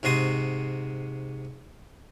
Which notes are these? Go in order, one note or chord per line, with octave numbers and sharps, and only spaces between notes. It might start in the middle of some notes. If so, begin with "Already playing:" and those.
G#2 C3 F#4 C6 D#6